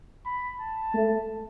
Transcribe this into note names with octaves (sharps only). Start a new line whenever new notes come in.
B5
A5
A3